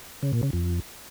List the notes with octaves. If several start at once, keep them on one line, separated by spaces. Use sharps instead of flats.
C#3
A#2
C#3
F2